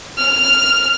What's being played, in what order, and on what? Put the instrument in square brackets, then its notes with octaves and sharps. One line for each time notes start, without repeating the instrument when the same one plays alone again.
[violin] F6